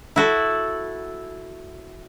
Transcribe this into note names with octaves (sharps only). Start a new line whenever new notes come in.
E4 F#4 A4